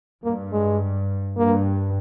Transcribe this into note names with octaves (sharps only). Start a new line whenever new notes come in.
G2 A#3
G#3
G2 A#3